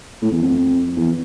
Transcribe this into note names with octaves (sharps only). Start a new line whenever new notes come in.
A2
E2
F2
E2